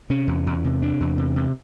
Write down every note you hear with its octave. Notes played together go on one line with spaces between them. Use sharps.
C3 C#4
E2
E2
C3
C3 D4
E2
C3
C3